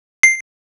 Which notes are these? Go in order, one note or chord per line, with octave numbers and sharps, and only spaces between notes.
C7